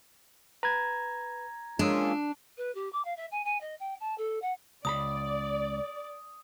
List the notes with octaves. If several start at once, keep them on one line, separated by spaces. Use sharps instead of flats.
B4 A#5 G#6
G#3 A#3 C#4 D4 F4 D#6 E6
B4
G4
D6
F5
E5
G#5
G#5
D#5
G5
A5
A4
F#5
C#2 D5 A#5 B5 D#6